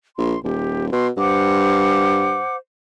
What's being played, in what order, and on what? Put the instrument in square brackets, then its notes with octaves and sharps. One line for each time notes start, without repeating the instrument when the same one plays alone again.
[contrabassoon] A#1 [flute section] C6
[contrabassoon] D#1 [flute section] G4
[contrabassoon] B2 [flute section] C6
[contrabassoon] G2 [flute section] C5 F#5 D6